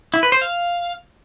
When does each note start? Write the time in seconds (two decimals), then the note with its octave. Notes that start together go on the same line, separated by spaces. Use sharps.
0.14 E4
0.23 B4
0.32 C5
0.41 F5